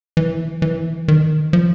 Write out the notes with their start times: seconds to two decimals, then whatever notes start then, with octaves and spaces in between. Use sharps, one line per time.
0.17 E3
0.62 E3
1.08 D#3
1.53 F3